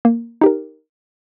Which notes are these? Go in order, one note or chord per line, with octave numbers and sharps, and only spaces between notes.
A#3
D#4 G4 A#4